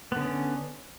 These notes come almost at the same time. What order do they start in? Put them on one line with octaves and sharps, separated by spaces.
B3 D3 C#4